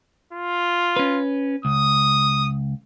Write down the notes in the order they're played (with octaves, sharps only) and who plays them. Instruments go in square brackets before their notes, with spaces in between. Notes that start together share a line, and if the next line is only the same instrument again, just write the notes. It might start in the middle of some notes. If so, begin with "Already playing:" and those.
[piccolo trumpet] F4
[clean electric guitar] C#4 B4
[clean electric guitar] C#2 [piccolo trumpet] D#6